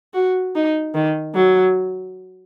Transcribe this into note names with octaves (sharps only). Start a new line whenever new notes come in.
F#4
D#4
D#3
F#3